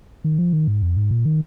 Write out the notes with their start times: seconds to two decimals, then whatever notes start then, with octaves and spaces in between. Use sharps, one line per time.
0.24 D#3
0.39 F3
0.53 D#3
0.68 G#2
0.82 F2
0.97 G#2
1.11 A#2
1.25 D#3